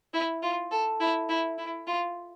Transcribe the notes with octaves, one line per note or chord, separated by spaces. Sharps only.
E4
F4
A4
E4
E4
E4
F4